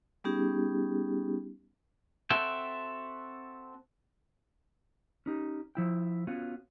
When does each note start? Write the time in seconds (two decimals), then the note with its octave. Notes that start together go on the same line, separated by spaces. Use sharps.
0.24 G3 B3 C#4 D#4 G4 G#4
2.30 C4 F#4 A4 E5 G5
5.26 C#4 D#4 G4
5.75 F3 E4 G5
6.27 B3 C#4 F4 F#4